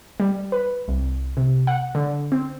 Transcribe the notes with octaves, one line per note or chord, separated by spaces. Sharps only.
G3
B4
C2
C3
F#5
D3
C4